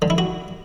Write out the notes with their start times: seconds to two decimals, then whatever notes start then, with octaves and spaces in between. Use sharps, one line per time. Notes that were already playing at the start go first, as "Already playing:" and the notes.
0.02 D3
0.10 E4
0.18 F#4